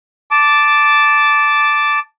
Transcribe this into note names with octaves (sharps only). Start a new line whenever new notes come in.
A5 D6